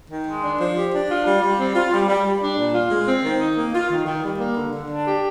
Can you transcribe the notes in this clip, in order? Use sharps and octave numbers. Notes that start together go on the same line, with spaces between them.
D#3
G#3
D4
F3
G4
D4
F4
G3
G3
C4
F4
G3
G3
G3
D4
A#2
F4
G#3
C4
D#3
D#4
A#3
F4
D#3
D#3
G3
A#3
D3
D3
D4
G4